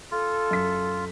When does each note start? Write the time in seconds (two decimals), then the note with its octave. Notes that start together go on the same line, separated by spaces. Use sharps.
0.11 F4 A4
0.51 F#2 B6